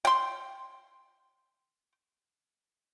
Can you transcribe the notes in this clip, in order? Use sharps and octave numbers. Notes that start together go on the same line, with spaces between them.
G5 C6